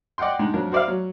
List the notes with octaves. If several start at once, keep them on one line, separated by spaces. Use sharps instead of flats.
D5 D#5 F#5 G5 C6
G#3 D4 D#4
F2 F#3 D4 A#4
F#4 C5 D5 E5 F5
F#3